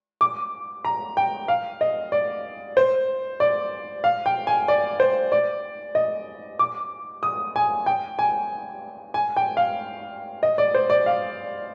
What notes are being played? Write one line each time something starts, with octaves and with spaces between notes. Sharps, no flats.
D6
A#5
G5
F5
D#5
D5
C5
D5
F5
G5
G#5
D5
C5
D5
D#5
D6
D#6
G#5
G5
G#5
G#5
G5
F5
D#5
D5
C5
D5
F5